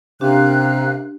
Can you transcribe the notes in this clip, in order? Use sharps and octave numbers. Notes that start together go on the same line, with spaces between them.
C3 C#4 D4 G4 A#4 F5 F#6